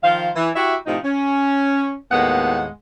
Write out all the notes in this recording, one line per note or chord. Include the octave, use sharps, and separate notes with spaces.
D#3 F3 C5 F5
E3
E4 F#4 G4 E5
A2 C3 F3 D#4
C#4
D#2 A2 G#3 A#3 B3 F#5